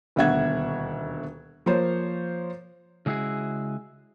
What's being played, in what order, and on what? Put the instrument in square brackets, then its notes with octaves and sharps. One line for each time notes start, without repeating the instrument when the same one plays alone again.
[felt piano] D#1 D2 B2 E5 F#5 G#6
F3 A#3 C5 C#5
[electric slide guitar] C#3 G#3 E4 F#4 G#4